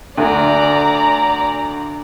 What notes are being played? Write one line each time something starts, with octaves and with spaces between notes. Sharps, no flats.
D2 D5 A#5